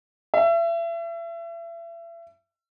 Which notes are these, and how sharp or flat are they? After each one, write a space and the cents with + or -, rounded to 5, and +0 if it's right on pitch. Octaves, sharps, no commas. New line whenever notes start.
E5 +35